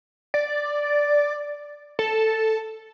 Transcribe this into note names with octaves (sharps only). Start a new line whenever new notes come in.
D5
A4